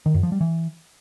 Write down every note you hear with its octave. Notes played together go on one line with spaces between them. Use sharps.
D#3
F#2
F3
G3
E3